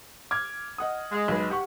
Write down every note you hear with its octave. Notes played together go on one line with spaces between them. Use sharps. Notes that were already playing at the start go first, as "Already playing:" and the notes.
D6 F6 G#6
D#5 F#5 D#6
G#3
B1 B4
G4 F#5 C#6